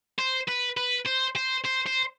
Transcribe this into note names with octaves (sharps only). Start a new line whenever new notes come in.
C5
B4
B4
C5
C5
C5
C5